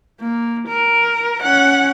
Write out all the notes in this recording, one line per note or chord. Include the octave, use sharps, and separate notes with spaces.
A#3
A#4
C#4 F#5